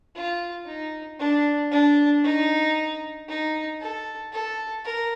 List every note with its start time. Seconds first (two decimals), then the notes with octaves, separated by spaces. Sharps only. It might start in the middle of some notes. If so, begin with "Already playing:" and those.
0.15 F4
0.66 D#4
1.19 D4
1.71 D4
2.24 D#4
3.29 D#4
3.80 A4
4.33 A4
4.84 A#4